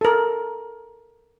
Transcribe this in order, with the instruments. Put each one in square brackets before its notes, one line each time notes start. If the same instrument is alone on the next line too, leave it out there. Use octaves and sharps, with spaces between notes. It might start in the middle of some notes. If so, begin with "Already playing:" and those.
[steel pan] A4 A#4